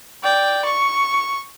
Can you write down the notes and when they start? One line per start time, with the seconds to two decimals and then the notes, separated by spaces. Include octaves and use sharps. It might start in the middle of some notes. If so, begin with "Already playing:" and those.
0.23 D5 G5
0.65 C#6